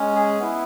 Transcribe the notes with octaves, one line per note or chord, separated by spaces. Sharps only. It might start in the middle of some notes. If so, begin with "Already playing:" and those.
Already playing: G#3 C#4
G#4
B3 E4